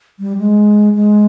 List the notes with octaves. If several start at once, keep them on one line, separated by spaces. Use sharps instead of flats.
G3
G#3
G#3